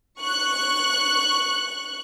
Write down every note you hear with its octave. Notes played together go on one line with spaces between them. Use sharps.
C#6 F#6